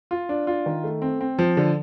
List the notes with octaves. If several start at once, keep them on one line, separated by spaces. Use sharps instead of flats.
F4
D4
F4
D#3
A3
C4
C4
F3
D3